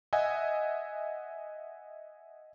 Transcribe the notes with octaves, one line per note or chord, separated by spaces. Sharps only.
D#5 E5 F#5 G#5